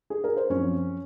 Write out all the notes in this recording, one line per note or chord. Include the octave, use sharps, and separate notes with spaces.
G#4
A#4
C5
F#2 F3 C4 C#4 C#5